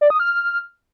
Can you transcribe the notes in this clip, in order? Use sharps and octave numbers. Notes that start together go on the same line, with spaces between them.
D5
D#6
F6